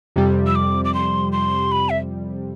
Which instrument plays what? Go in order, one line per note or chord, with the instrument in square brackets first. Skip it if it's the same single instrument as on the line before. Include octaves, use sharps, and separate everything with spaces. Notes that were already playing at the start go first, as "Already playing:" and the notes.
[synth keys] F2 C3 G3
[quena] E6
D6
D6
C6
C6
B5
E5